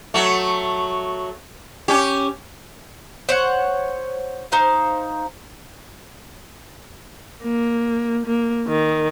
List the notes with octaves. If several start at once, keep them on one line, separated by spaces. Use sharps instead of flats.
F#3 A3
C#4 G4
C5 C#5 F#5
D#4 C5 F5
A#3
A#3
D#3